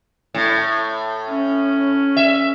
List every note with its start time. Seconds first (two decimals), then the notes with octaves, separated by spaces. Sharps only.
0.34 A2
1.28 C#4
2.16 E5